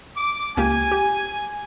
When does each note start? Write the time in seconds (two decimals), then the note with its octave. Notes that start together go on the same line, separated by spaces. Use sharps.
0.15 D6
0.57 C#2 A#3 G4 G#5
0.91 G4